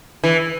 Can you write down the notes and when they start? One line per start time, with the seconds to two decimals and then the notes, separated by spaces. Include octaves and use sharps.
0.24 E3